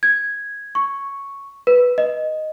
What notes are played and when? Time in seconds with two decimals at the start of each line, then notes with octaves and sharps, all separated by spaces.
0.03 G#6
0.75 C#6
1.67 B4
1.98 D#5